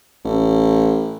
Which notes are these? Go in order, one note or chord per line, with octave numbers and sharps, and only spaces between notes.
A1